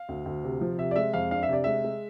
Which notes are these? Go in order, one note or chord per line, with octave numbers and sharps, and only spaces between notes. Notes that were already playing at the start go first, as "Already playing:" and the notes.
Already playing: F5
D2
D2
C3
F3
C3 E5
D5
G#3 E5
F2 F5
D4 F5
E5
C3 D5
G#3 E5
G#3